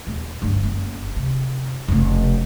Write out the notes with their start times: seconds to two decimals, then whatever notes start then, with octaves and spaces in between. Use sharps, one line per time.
0.07 D#1
0.42 G1 D3
0.63 F#1
1.16 C3
1.88 F1 C#3